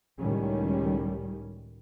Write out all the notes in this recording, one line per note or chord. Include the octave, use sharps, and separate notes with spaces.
C#2 A2 D#3 G3 C#4